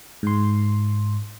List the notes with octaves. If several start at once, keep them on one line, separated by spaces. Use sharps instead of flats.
G#2 C6